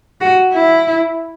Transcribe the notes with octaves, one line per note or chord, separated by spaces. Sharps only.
F#4
E4